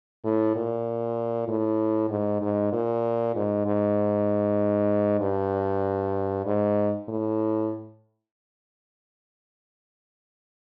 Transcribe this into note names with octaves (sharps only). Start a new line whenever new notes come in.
A2
A#2
A2
G#2
G#2
A#2
G#2
G#2
G2
G#2
A2